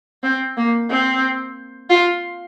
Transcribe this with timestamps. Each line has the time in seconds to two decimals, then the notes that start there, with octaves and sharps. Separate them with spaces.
0.23 C4
0.57 A#3
0.90 C4
1.90 F4